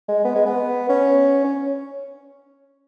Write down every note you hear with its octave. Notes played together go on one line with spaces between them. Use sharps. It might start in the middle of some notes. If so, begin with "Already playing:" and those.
G#3
B3
G#3
B3
C#4
C#4